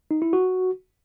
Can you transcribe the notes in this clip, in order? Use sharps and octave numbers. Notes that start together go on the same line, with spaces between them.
D#4
E4
F#4